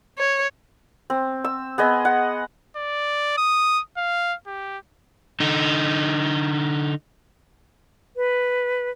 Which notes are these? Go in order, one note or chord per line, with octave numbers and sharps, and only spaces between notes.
C#5
C4
E6
B3 G#4 D#5
F#5
D5
D#6
F5
G4
D3 D#4
B4